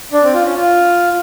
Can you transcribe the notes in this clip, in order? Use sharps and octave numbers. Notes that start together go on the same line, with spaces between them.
D4
C4
F4
C#4
F4